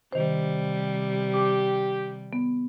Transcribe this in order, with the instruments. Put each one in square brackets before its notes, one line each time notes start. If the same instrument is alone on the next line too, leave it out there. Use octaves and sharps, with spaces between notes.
[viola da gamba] C3 G3 [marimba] D#3 C5
[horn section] G4 [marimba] D6
[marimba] B3